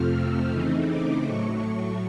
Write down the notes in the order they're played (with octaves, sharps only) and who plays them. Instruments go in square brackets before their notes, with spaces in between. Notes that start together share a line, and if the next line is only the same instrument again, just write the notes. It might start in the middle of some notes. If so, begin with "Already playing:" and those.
Already playing: [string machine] F2 C3 F3 A3 C4 F6
E6
C#3 E3 A3 C4 D#4
D6
A2 F#3 A3 C#6